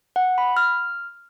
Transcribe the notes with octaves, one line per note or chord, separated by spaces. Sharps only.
F#5
B5
F6